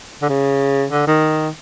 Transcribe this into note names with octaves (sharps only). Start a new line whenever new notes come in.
D3
C#3
D3
D#3